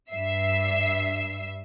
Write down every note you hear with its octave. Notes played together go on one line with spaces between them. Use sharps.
G2 E5 E6 C7